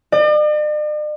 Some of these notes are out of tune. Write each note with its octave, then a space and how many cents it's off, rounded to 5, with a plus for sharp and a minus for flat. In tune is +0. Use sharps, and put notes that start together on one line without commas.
D5 +45